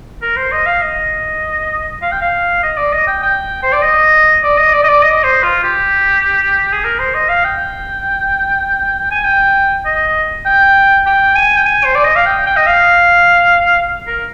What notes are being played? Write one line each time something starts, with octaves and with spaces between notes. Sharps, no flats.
A#4
C5
D#5
F5
D#5
F5
G5
F5
D#5
D5
D#5
G5
G5
C5
D5
D#5
D5
D#5
D5
D#5
D5
D#5
C5
F4
G4
G#4
A#4
C5
D#5
F5
G5
G#5
G5
D#5
G5
G5
G#5
G5
G#5
C5
D5
D#5
F5
G5
G5
D#5
F5
A#4